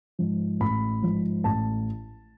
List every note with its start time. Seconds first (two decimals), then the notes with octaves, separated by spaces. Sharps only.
0.19 G#2 F3
0.60 A1 B5
1.02 G#2 F3
1.44 A1 A5